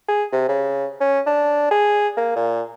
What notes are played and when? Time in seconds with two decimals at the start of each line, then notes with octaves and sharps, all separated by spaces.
0.08 G#4
0.32 C3
0.49 C#3
1.01 C#4
1.27 D4
1.71 G#4
2.17 A#3
2.36 A#2